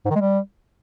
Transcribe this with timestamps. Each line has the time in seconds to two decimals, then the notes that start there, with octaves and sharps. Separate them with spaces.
0.06 G#2
0.11 D#3
0.16 G#3
0.21 G3